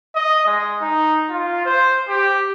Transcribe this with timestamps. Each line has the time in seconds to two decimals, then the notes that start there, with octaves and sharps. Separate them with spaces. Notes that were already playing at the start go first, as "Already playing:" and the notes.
0.15 D#5
0.46 G#3
0.81 D#4
1.29 F4
1.65 C5
2.08 G4